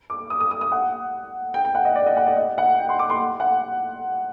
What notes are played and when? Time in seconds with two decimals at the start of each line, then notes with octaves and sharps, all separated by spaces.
0.10 D6
0.30 D#6
0.40 D#6
0.51 D#6
0.61 D#6
0.72 F#5
1.54 G5
1.65 G5
1.75 F#5
1.85 D#5
1.95 D5
2.06 D#5
2.17 F#5
2.27 D5
2.37 D#5
2.58 F#5
2.78 G5
2.89 C6
2.99 D6
3.10 C6
3.40 F#5